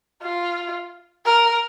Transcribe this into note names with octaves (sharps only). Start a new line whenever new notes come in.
F4
A#4